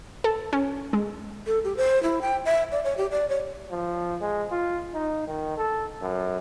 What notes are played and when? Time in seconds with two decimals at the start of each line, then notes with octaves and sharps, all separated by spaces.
0.24 A4
0.53 C#4
0.93 G#3
1.47 A4
1.64 G4
1.77 C5
2.03 E4
2.22 G5
2.45 E5
2.72 D5
2.84 C#5
2.97 G4
3.11 D5
3.29 C#5
3.70 F3
4.21 G#3
4.51 F4
4.94 D#4
5.27 D#3
5.57 A4
6.02 F#2